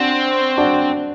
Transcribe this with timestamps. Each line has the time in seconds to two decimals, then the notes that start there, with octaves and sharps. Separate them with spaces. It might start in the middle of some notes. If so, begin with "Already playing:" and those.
Already playing: C4 D4 F#4
0.57 D4 F#4